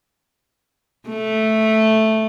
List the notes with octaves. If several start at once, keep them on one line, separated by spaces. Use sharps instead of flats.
A3